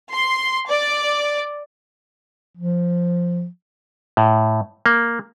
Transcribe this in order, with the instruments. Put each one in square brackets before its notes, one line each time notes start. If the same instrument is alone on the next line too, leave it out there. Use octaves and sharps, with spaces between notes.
[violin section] C6
D5
[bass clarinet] F3
[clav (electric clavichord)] A2
A#3